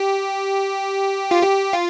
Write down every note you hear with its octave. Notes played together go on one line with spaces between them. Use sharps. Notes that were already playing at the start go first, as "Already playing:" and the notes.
Already playing: G4
F4
G4
F4